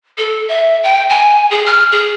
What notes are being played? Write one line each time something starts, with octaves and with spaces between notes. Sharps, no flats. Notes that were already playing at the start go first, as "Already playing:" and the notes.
A4
E5
G5
G#5
G#4
F6
G#4